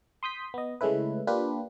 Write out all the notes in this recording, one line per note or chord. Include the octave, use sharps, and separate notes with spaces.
C6 D#6 G6 B6
B3 D#5
C#3 G#3 A3 C#4 E4 B4
A#3 D4 F4 G4 B4